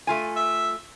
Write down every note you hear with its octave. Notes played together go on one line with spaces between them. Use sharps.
A3 F4 G#5
E5